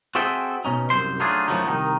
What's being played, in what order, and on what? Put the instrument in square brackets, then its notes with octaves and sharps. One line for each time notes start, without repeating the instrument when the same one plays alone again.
[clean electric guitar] C4 F#4 G#4 A4 E5 G5
B2 C#4 D#4
C2 F#2 C5 C6
F#3 A3 D4 D#4 F4 G#4
F#2 A2 F3 F#3 A3 D#4
C2 D#3 D#4